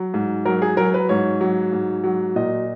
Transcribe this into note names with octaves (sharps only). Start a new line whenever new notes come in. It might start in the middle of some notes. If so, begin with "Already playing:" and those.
Already playing: F#3
G#2
F#3 A#4
G#4
F#3 A#4
B4
G#2 C#5
F#3
G#2
F#3
A#2 D#5